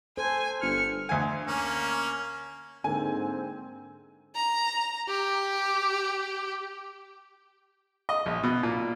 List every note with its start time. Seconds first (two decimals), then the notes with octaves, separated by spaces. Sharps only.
0.17 A4 C5 G#5
0.62 G1 F6 C#7
1.09 D2 G#5
1.48 A#3 C#4
2.84 G#2 D3 A#3 C4 G#5
4.35 A#5
5.08 G4
8.09 D#5
8.26 A#1
8.43 B2
8.63 A#2